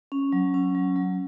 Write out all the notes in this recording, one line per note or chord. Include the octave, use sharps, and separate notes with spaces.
C#4
F#3
C#4
F#3
F#3